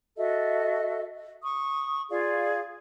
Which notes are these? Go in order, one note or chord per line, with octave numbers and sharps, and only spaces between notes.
F#4 A4 D#5 E5
C#6 D#6
F4 G#4 D5 F5